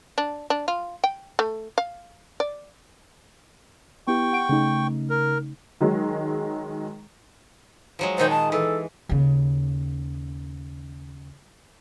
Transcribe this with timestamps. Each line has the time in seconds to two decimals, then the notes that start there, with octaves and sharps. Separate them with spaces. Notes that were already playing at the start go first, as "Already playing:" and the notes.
0.18 D4
0.50 D4
0.68 F4
1.04 G5
1.39 A3
1.78 F5
2.40 D5
4.07 B3 E4 G4 G5 C#6
4.33 F#5 D7
4.49 C#3 A3 D#4
5.10 A#4
5.81 D#3 F#3 G#3
7.99 F3 F#3 G#3
8.18 A#2 D#3 G#3 C5
8.30 A5
8.52 E3 A4
9.09 D#2 C#3